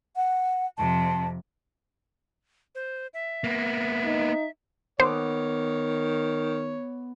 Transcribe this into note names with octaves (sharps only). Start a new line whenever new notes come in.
F#5
F2 C3 A5
C5
E5
A#3 B3
D#4
D#3 B3 C5 C#5 D6